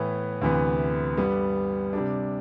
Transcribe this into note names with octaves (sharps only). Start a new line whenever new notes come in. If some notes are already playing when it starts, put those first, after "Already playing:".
Already playing: A2 E3 B3
D2 C3 E3 B3
G2 D3 G3 B3
C3 G3 D4